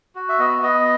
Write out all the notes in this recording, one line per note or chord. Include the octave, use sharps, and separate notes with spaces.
F#4
E5
B3 D#5
B3 D#5